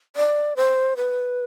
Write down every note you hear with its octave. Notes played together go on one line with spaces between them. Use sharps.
D5
C5
B4